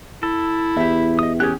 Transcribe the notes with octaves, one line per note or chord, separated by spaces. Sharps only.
E4 A4
E2 G4 E5
D#5 D#6
E3 C#4 G4 G#4 C#5 F#6